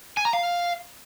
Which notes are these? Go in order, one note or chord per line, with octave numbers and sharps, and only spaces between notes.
G#5
A#5
F5